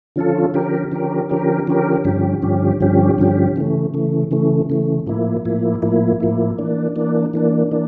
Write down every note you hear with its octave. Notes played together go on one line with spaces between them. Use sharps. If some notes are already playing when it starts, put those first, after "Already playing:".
D3 F3 C#4 F4 A4
D3 F3 C#4 G4 A#4
D3 F3 C#4 G4 A#4
D3 F3 C#4 G4 A#4
D3 F3 C#4 G4 A#4
G2 D3 F3 C#4 G4
G2 D3 F3 C#4 G4
G2 D3 F3 C#4 G4
G2 D3 F3 C#4 G4
C#3 E3 A3
C#3 E3 A3
C#3 E3 A3
C#3 E3 A3
A2 F3 A#3 E4
A2 F3 A#3 E4
A2 F3 A#3 E4
A2 F3 A#3 E4
E3 A#3 D4
E3 A#3 D4
E3 A#3 D4
E3 A#3 D4